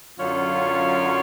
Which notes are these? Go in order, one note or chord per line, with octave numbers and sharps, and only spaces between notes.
F#2 D3 F#3 C#4 F4